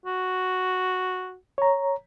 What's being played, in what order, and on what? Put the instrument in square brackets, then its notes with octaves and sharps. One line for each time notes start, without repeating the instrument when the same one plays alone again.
[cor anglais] F#4
[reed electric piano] C#5 A#5